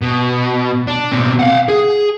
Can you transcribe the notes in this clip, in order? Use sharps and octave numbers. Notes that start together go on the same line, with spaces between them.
B2
D4
B2 C4
F5 F#5
G#4